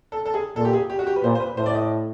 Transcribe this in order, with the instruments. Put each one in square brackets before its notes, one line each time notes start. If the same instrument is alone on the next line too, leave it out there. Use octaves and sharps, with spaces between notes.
[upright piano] A4
A4
G#4
[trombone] A#2 [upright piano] A4
[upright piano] G4
G#4
G4
F#4
G4
B4
[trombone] A#2 [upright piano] C5
[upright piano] C5
B4
[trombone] A2 [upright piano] C5
[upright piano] D5
D#5